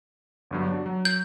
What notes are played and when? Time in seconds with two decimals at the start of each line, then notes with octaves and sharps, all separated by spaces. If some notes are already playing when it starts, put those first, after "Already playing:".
0.51 G1 G2 F#3
0.71 D4 F#4
0.86 F#3
1.05 G6